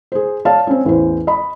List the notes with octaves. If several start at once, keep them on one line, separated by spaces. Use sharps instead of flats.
G#4 C5
C#5 D5 F5 A5
C4 C#4
A1 E2 C5
D#5 B5